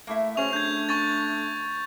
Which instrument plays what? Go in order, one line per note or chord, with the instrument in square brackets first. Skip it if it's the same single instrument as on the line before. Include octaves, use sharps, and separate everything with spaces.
[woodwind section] A3 [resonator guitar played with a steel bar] A#3 E4 E5
[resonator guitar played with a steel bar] F#3 G#4 C5 [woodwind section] C#4 [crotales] C#6 F7
[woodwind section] A3 D4 [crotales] G6 G#6
[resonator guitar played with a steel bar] C#4 [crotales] C#6 A6